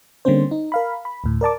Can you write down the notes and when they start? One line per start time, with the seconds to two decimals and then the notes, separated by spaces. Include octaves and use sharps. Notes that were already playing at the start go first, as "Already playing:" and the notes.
0.25 D3 G3 A#3 C4 C#4 C5
0.51 D#4
0.72 A#4 F5 B5
1.05 B5
1.24 D2 A2
1.41 A#4 D5 A5 D6